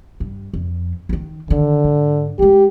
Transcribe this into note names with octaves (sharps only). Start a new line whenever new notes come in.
G2
F2
D3 D#3
D3 D#3
G#2
G#3 D#4 G4